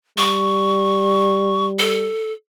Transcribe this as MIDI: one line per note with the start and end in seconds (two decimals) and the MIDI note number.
0.18 2.10 55
0.18 1.66 85
1.79 2.32 69